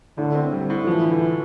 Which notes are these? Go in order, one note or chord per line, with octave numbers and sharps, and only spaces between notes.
A2 D3
C4
G3
A2
E3 F3
D3